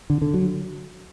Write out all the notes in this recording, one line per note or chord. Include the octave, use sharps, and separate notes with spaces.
D3
D3
F#3